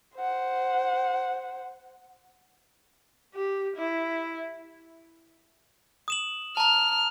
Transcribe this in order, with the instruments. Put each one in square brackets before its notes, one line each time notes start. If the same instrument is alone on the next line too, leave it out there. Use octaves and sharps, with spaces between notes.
[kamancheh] C5 F#5
[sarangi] G4
E4
[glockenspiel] D#6 E7 F#7
[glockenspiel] A5 A#5 [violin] F6